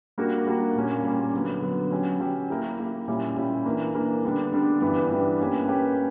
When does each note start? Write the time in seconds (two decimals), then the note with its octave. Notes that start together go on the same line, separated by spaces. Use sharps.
0.18 G3 A#3 D4 F#4 A#4
0.47 G3 A#3 D4 F#4 A#4
0.76 A#2 G3 A#3 C#4
1.04 A#2 G3 A#3 C#4
1.34 D3 F#3 B3
1.62 D3 F#3 B3
1.91 F#3 C#4 G4
2.21 F#3 C#4 G4
2.50 A#3 E4 G4 A#4
2.79 A#3 E4 G4 A#4
3.08 A#2 G3 C#4 E4 G4
3.37 A#2 G3 C#4 E4 G4
3.65 E3 A#3 D4 A#4
3.95 E3 A#3 D4 A#4
4.24 D3 G3 B3 D4
4.53 D3 G3 B3 D4
4.82 G2 E3 B3 D4 G4
5.10 G2 E3 B3 D4 G4
5.40 A#3 C#4 G4 B4
5.68 A#3 C#4 G4 B4